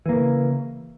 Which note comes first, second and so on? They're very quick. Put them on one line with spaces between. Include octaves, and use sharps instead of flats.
E3 A#3 C#3